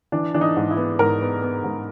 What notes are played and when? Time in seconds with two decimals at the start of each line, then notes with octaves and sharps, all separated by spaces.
0.12 E3 D4
0.34 E3 D4
0.41 D#4
0.57 G#2
0.71 E4
0.77 B3
0.99 G#2 A#4
1.21 B3
1.42 B3
1.64 G#2